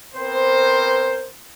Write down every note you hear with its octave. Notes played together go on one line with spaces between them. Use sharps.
B3 C4 A#4 C5